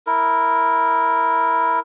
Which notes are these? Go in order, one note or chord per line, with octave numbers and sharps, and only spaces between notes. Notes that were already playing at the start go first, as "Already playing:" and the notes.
E4 A#4